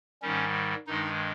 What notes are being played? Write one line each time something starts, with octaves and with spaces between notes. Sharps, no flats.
G#2 D#3 G3 C#4
G2 D#3 G#3 D#4